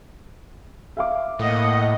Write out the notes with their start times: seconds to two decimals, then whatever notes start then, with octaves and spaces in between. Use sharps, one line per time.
0.97 E5 F5 D6
1.39 A2 A#3 D#5 F#5